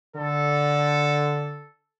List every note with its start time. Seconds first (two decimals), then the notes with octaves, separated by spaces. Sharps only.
0.16 D3 A4